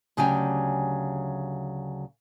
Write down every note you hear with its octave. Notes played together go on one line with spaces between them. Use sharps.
D2 C#3 F#3 G4 G5 G#5